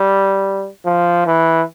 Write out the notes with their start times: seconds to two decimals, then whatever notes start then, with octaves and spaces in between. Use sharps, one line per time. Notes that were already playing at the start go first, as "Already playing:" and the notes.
Already playing: G3
0.85 F3
1.26 E3